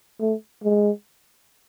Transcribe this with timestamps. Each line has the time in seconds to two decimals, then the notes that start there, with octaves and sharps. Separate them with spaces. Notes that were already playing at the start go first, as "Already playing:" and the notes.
0.20 A3
0.64 G#3